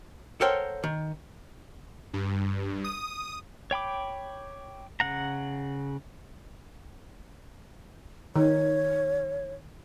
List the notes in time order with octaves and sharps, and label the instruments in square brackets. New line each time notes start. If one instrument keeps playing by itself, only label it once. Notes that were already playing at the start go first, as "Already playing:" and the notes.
[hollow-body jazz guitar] A4 A#4 C5 C#5 F#5 G5
D#3
[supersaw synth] G2
D#6
[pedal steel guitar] C#5 G5 B5 D6
C#3 F#5 A#5
[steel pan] D#3 [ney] C#5